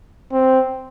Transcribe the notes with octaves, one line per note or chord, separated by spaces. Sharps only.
C4